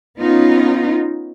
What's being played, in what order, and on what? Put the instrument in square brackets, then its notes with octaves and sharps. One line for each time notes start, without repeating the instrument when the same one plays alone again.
[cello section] B3 C#4 D#4 F4